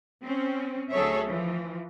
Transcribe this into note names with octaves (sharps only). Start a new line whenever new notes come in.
C4 C#4
D2 F#3 G#4 A4 C#5 E5
E3 F3